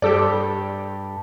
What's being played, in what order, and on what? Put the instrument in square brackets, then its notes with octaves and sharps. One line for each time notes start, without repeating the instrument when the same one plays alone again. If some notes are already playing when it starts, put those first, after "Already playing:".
[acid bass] G2 [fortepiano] G4 A4 D5